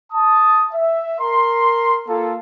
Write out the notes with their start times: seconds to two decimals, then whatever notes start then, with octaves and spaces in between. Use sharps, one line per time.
0.12 A5 D#6
0.74 E5
1.20 A#4 C6
2.08 A#3 F4 A4